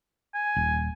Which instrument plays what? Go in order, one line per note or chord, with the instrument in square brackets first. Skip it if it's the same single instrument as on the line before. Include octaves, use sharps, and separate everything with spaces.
[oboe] G#5
[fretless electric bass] D#1